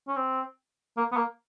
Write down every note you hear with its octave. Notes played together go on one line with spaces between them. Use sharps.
C#4
C4
A#3
B3
A#3